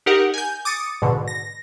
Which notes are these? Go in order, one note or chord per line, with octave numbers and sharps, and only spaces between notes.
D#4 G4 A#4 F#5
G#5 G6
D6 D#6 A6 C#7
G#2 B2 D3
A#6